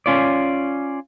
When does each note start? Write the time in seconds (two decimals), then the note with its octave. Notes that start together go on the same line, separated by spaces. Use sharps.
0.06 C#4 F4 D5